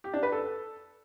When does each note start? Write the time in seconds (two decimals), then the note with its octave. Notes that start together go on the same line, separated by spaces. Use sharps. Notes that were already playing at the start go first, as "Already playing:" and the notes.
0.04 G4
0.14 D4
0.23 B4
0.32 A4